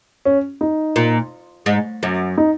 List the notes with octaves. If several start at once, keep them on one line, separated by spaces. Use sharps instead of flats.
C#4
D#4
A#2
G#2
F#2
D#4